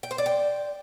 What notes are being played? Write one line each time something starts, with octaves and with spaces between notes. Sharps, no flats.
G5
C5
D5
G5